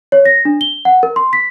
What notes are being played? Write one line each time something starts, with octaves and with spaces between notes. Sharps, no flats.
C#5
A#6
D4
G7
F#5
A#4
C6
B6